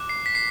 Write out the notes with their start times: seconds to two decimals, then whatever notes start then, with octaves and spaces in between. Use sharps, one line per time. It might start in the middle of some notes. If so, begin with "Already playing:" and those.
Already playing: D6 F#6
0.09 C7
0.26 B6
0.35 C7